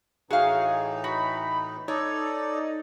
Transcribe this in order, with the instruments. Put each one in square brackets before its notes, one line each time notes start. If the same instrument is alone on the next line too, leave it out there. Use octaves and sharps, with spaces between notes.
[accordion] A2 E3 D#4 [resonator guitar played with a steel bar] F#4 F5 [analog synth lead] G#4
[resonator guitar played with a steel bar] F#4 [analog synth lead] B5
[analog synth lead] D#4 [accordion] A4 D5 [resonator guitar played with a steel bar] C#5